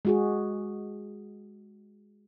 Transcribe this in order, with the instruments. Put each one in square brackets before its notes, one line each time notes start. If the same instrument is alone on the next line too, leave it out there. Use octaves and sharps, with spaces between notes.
[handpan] G#3 F#4 G#4